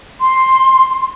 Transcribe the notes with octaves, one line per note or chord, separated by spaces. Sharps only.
C6